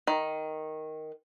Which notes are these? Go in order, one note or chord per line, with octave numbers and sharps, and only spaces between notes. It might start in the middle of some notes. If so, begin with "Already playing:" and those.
D#3